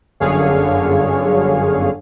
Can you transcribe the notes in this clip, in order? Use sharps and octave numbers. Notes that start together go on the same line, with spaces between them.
G1 F#2 D3 G#4 C#5 F5